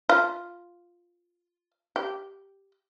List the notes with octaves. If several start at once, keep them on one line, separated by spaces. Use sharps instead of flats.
F4
G4